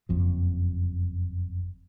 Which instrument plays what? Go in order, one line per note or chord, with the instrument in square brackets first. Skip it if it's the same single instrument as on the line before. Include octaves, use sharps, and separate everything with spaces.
[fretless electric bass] F#1 F2 F3